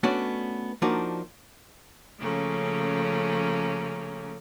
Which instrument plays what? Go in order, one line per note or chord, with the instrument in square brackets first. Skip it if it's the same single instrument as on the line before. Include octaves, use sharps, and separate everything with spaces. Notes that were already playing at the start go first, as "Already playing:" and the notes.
[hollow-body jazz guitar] A3 B3 C#4 D4 F#4 D5
F3 A#3 D4 D#4 F#4
[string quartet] C#3 F3 A3 A#3 C#4